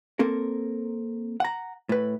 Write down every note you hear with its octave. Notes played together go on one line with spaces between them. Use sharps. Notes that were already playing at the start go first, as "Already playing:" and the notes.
A#3 C4 A4 A#4
F#5 A#5
A2 B4